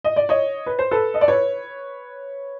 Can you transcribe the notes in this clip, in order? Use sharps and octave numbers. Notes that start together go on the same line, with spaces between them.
D#5
D5
C#5 D#5
B4
C5
A4 B4
D#5
D5
B4 C#5